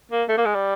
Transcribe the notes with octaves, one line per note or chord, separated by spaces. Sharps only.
A#3
A3
A#3
G#3
G3